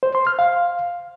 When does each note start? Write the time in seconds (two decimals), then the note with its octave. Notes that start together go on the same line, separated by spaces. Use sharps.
0.03 C5
0.15 C6
0.27 F6
0.39 F5